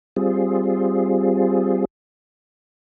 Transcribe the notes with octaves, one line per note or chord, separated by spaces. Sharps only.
G3 C4 F4 G#4